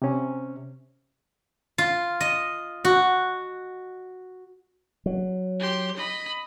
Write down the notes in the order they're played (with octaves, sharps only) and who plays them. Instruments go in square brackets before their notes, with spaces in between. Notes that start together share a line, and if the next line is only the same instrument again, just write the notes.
[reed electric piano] C3 C#4
[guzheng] F4
D#5
F#4
[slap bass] F#3
[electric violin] G4 C6
D#5 B5